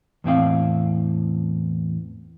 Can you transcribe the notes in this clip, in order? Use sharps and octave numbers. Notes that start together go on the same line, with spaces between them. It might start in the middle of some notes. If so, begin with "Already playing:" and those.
E2 A2 C4 F5